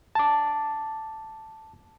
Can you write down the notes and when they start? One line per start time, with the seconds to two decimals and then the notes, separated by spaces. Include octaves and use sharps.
0.15 A5 D6